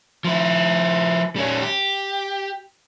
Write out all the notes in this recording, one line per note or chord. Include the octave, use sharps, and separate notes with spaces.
F3 E4
G3 C#4
G4